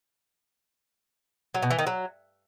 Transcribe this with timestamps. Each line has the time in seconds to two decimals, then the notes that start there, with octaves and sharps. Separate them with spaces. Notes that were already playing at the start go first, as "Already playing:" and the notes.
1.54 F#3
1.62 B2
1.71 E3
1.79 D#3
1.87 F#3